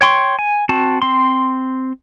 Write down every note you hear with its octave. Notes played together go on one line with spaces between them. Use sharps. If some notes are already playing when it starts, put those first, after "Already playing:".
C#5 G5 C6 C#6
G#5
C4 F#4 A5
C4 C6